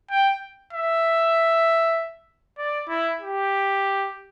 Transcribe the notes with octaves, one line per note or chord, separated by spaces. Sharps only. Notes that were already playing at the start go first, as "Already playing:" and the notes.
G5
E5
D5
E4
G4